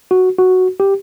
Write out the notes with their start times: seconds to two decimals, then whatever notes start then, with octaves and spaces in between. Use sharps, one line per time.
0.11 F#4
0.39 F#4
0.80 G4